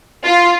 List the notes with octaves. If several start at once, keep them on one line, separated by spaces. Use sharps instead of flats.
F4